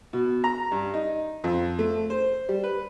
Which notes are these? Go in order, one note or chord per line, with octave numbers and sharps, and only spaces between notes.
B2
A#5
G2
D#4
F2
A3
C5
G3
B4